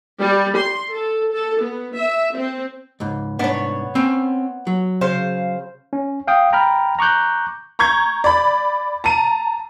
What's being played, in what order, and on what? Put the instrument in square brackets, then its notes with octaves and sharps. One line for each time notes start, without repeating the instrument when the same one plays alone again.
[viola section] G3
C6
A4
A4
B3
E5
C4
[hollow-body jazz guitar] C#2 G#2
[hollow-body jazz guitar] C2 G#2 D4 [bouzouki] B3 C#5
[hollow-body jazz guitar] C4 C#4
F#3
[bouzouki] C#3 C5 F5
[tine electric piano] C#4
F5 G5 D#6
G5 A#5 B5 F6
A#5 C#6 D6 F#6 G6
[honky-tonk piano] A#5 C#6 G6 G#6
D5 B5
A5 A#5 D#7